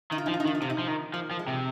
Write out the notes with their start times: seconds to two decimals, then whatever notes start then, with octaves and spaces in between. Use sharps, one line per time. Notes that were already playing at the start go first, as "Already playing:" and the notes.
0.11 D#3 D#4
0.18 F4
0.26 F3 D#4
0.34 F4
0.40 D#4
0.46 D#3 F4
0.55 D#4
0.62 C3 F4
0.70 D#4
0.78 F3
0.88 D#3
1.14 F3 A#3
1.31 F3
1.39 G#3
1.48 C3